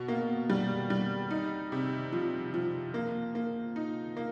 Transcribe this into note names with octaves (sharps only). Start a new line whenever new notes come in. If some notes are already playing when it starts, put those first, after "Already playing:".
Already playing: B2
A#3
G3
G3
D#4
C3
F3
F3
A#3
A#3
D#4
A#3